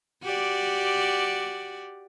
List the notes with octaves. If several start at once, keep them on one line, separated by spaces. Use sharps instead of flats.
F#4 G4 D5